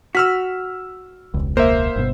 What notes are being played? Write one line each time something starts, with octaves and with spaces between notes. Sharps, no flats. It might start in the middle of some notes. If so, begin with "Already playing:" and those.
F#4 E6 F6 B6
E1 C#2
A#3 C5 E5
G1 B2